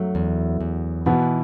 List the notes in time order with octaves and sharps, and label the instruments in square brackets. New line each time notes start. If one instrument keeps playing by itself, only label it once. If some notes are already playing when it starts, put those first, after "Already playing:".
Already playing: [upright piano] F#2 F#3 [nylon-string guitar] A3
[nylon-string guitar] E2
E2
[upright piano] B2 B3 [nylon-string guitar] E3